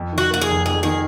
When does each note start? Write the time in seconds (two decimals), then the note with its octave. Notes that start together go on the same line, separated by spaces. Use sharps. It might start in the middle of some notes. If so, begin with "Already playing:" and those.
Already playing: F2
0.13 D#3
0.18 F#4
0.30 A#3 F#4
0.42 G#4
0.48 F1
0.66 F2 G#4
0.83 D#3 G#4